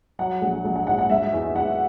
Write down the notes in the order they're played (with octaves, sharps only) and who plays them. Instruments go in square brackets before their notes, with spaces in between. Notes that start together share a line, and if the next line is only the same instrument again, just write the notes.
[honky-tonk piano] F#3 F#5
A#1
A#1
F#5
G#2 F#5
F#5
G#3 E5
E2
E2 F#5